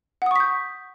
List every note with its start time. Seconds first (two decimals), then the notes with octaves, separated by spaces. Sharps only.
0.22 F#5
0.26 D#6
0.31 C#6
0.36 B6
0.40 G6